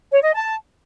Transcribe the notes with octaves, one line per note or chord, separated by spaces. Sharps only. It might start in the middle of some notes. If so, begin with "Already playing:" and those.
C#5
D#5
A5